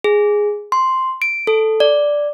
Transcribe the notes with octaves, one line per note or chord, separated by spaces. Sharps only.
G#4
C6
D7
A4
D5